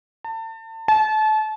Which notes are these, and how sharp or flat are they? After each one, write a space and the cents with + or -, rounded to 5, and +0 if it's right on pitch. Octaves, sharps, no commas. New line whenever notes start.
A5 +35
A5 -30